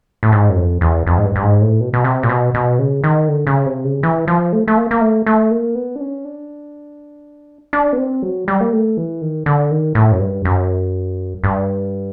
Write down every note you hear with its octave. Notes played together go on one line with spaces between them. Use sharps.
A2
G#2
F#2
F2
E2
F2
G#2
G2
G2
G#2
A2
B2
B2
C3
A#2
B2
B2
C#3
D#3
D3
C#3
C3
C#3
E3
F3
A3
A3
A#3
A#3
A3
A3
A#3
B3
D4
C#4
D4
D4
B3
C4
F#3
G3
A#3
A3
E3
D#3
D3
D#3
A2
F#2
G2
F#2
G2